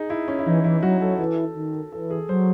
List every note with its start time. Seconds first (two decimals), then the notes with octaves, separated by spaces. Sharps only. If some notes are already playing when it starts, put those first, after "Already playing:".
Already playing: D#4 G#4
0.10 E4
0.28 C#4
0.39 E4
0.46 E3 D#4
0.64 E3 E4
0.83 F#3 F#4
1.01 F#3 A4
1.19 E3 A4
1.55 D#3
1.92 E3 A4
2.10 G#4
2.29 F#3 C5